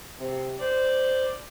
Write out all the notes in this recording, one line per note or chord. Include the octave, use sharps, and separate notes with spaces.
C3
C5 D5